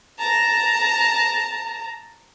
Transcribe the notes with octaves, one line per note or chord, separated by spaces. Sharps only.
A5 A#5